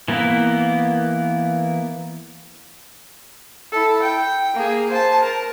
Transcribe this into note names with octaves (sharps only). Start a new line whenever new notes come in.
E3 A#3 B3 E4
E4 A4
G5
A#3 G#4
C5 A5
A#4